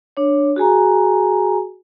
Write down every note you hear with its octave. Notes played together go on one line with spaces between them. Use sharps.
D4 C#5
F#4 G#4 G#5 A#5